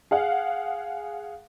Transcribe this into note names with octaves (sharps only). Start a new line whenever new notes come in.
G#4 F5 F#5